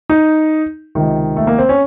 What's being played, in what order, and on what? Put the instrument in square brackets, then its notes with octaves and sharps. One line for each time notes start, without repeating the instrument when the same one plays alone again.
[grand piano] D#4
C#2 C3 D#3
A3
A#3
C4
C#4